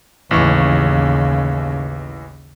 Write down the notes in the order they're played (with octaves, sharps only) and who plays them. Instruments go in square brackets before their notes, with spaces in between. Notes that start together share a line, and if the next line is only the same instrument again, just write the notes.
[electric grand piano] A1 E3 C#6 [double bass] D#2 C#3